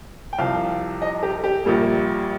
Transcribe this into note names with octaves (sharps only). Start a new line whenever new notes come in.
G5
C2 C3 F3 F5
D#5
G4
G4
A#1 A#2 G3 A#3